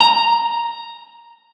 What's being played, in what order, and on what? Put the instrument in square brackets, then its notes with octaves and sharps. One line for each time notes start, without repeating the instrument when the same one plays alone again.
[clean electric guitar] A#5